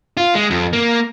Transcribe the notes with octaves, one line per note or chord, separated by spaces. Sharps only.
F4
G#3
F2
A#3